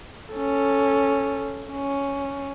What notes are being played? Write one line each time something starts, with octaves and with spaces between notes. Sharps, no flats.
C#4 A4
C#4